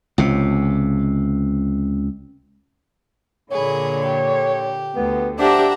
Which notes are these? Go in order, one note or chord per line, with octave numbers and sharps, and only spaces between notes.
C#2 C3
A#2 D3 G#4 C#5 B5
G4
D2 B3
D4 G4 C5 E5 F#5 A#5